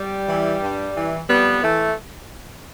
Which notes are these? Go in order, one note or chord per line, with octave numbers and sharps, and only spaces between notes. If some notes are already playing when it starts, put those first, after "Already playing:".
Already playing: G3
E3
G2
E3
F2 G3 B3
E3 A3